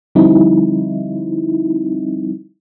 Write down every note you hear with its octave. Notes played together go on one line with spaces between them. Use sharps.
D3 F3 G3 C4 D#4 E4